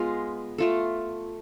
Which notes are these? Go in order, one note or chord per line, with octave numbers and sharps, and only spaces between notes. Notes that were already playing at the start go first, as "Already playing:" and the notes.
Already playing: G#3 B3 F4
A3 F4 A4